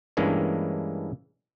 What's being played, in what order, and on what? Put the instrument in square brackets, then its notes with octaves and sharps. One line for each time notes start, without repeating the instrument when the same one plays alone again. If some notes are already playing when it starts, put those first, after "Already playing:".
[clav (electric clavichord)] G2 E3 G#3 A#3 C#4 D4